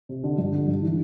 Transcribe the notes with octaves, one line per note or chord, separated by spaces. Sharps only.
C3
D3
G2
D3
G2
E3